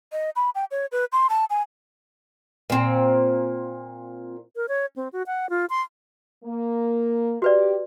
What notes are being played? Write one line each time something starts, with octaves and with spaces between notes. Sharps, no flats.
D#5
B5
G5
C#5
B4
C6
A5
G#5
A#2 C4
A#4
C#5
C4
F#4
F#5
F4
C6
A#3
F#4 G4 B4 D5